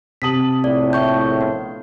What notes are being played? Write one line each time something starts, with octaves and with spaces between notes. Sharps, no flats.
C3 A5 D#6 B6 F#7
A#1 A2 D5
E5 C#6 G6
B3